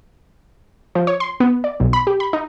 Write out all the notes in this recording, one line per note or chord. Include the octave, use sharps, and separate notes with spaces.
F3
C#5
C6
B3
D5
B1
B5
G4
B5
D#4